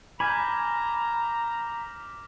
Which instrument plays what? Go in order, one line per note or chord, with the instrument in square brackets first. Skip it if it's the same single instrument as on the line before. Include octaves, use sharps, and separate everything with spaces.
[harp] G#5 [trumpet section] A#5 [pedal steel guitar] B5 [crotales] D6 F6 G6